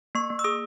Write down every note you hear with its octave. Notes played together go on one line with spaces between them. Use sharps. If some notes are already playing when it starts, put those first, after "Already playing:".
A#3 C#6
A#3
E6
G#4 D#6